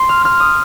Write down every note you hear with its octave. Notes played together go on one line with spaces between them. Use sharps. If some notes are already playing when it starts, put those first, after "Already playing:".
Already playing: C6
F6
F6
D#6